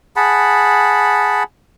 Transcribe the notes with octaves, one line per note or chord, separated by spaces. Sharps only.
G#4 F#5 A5 B5